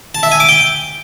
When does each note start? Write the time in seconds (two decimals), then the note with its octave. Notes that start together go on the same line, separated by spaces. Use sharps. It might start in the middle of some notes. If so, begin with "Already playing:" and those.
0.15 A5
0.23 E5
0.32 G#5
0.40 D6
0.49 G5